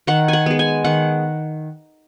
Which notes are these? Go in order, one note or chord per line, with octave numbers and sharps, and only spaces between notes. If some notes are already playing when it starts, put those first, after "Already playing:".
D#3 F#5
F#5 G#5
G#3 B3
G#5
D#3 F#5